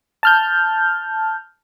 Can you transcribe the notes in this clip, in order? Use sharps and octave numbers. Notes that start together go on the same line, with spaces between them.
A5 F6 G6